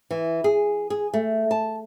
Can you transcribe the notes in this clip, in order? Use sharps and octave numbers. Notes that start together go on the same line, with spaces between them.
E3
G#4
G#4
A3
A5